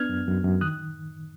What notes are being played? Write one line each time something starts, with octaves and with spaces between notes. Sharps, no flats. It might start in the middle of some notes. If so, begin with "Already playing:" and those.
Already playing: B3 D4 F6 G#6
F#2
F#2
F#2
D#3 D#6 F#6